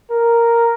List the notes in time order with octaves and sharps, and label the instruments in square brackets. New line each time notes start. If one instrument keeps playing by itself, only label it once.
[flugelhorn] A#4